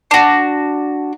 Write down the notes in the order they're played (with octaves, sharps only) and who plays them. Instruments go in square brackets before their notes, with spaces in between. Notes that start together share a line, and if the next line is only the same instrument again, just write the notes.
[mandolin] D4 F#4